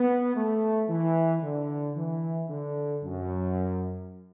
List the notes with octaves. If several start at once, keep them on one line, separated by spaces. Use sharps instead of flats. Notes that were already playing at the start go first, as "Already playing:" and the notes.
Already playing: B3
A3
E3
D3
E3
D3
F#2